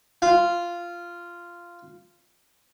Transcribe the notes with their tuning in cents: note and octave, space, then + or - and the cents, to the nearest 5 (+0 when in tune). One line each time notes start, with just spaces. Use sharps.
F4 -10